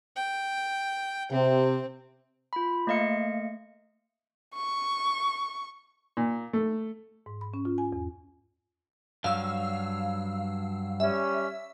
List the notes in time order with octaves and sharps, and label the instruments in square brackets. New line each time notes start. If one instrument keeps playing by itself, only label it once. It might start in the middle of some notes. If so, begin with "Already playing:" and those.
[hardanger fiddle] G5
[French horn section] C3 [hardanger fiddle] C4
[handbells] F4 B5
A3 A#3 D#5 F5 C#7
[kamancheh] C#6
[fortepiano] A#2
A3
[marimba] G#2
B5
C#4
F4
G#5
E2
[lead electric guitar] G2 F#3 [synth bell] F5 E6
[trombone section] G3 C#4 [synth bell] E5